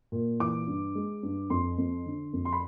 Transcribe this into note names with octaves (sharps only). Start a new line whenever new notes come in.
A#2
E3 D6
G2
G#3
G2
F2 C6
F2
D3
F2
C6
B5